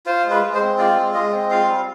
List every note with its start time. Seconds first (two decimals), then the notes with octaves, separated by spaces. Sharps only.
0.06 F4 C5
0.24 G#3
0.31 B4
0.42 G#3
0.54 C5
0.61 C4
0.78 F4 D5
0.96 G#3
1.14 G#3 D#5
1.32 C4
1.51 F4 F5
1.69 G3